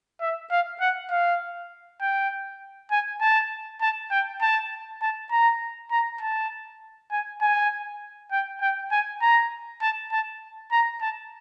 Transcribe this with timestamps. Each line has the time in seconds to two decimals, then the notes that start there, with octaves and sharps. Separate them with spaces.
0.21 E5
0.51 F5
0.81 F#5
1.11 F5
2.01 G5
2.91 G#5
3.21 A5
3.81 A5
4.11 G5
4.41 A5
5.02 A5
5.32 A#5
5.91 A#5
6.21 A5
7.12 G#5
7.41 G#5
8.32 G5
8.61 G5
8.91 G#5
9.22 A#5
9.82 A5
10.12 A5
10.72 A#5
11.01 A5